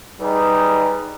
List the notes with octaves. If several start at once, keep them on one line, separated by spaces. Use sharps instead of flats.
G3 D#4 G#4 B4